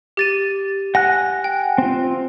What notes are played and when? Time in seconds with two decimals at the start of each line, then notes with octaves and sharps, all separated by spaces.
0.17 G4 A6 D#7
0.95 F#5 G#5 F#6 A#6
1.44 G5
1.78 C4 F4